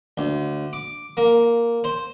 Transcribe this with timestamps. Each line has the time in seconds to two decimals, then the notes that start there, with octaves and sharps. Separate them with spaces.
0.18 D2
0.73 D6
1.17 A#3
1.84 C5